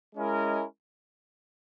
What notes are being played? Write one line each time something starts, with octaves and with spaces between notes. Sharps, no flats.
G#3 C#4 E4 A#4 D#5